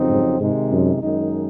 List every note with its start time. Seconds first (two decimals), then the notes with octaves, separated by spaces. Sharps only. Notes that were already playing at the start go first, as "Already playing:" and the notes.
Already playing: F2 C#3 F#3 C4 D#4
0.09 G#2
0.40 G#2 C3 D#3 G#3 D#4
0.72 F#2
1.02 F#2 D#3 G#3 D#4